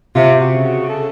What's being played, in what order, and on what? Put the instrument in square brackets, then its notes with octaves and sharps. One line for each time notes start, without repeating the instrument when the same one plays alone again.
[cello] C3 [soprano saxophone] F4
[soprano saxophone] F#4
[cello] C#3
[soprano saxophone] F#4
A4